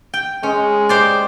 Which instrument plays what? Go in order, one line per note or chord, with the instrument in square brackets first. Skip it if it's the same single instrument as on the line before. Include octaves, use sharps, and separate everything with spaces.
[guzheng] G5
[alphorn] G#3 [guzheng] C#4
[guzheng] G4 C5 D5